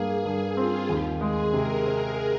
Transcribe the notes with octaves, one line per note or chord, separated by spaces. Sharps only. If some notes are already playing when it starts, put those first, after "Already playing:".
Already playing: G2 A#3 G#4
G2 G#4
C4 F4
D#2 G4
G#3 G#4
C3 A#4
C4